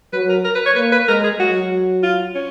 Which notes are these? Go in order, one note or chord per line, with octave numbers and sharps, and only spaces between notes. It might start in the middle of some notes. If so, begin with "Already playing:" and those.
F#3 B4
A#4
A#4
B4
C#5
A#3 B4
B4
G#3 A#4
G#4
F#3 F#4
F4
C#4